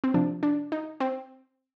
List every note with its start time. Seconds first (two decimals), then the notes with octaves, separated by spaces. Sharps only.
0.04 C4
0.14 C3 F3 D4
0.43 D4
0.72 D#4
1.00 C4